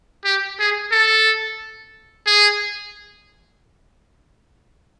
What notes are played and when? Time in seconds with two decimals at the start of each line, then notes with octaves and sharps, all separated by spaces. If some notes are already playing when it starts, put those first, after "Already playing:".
0.25 G4
0.59 G#4
0.92 A4
2.27 G#4